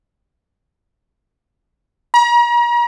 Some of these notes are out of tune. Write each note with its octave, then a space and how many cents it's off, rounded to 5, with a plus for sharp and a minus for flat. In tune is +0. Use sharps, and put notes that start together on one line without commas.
A#5 +40